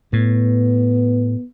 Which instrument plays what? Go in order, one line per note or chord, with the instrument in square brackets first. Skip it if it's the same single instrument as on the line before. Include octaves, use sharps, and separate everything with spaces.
[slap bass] A2 [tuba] B3